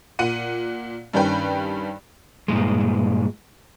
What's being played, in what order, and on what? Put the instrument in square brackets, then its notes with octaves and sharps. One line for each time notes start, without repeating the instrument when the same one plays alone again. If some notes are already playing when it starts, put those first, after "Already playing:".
[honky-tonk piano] A#2 F#5 D#7
G2 D#3 G3 C#4 B4 G5
[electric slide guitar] G2 A#2 G#3